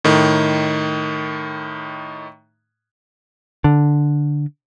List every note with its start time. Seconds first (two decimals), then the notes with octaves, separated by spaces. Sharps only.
0.04 A2 D#3
3.64 D3